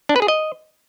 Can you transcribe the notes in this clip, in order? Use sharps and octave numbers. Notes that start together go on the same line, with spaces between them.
D4
B4
G#4
D#5